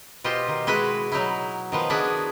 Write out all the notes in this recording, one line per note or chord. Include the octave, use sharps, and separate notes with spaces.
B2 F4 G4 C5 D#5
D#3
G#3 E4 F#4 B4
F#3 D#4 E4
D#3 F3 B3
B3 D4 E4 F#4 G#4